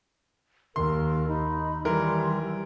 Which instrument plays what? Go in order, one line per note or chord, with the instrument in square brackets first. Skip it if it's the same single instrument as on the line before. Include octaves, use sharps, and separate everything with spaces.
[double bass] D#2 [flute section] A#4 [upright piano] C6
[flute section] D#4 B5
[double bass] D#3 G3 [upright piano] E3 A#4 [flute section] C6